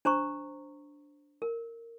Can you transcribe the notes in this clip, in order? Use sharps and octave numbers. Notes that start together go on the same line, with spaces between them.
D4 C5 A#5 C#6
A#4